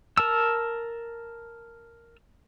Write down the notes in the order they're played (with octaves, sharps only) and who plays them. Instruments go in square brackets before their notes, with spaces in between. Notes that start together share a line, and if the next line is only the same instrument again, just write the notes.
[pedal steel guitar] A#4 A5 E6